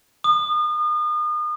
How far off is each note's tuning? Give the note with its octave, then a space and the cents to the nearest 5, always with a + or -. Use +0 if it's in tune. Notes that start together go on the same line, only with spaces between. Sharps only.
D#6 -35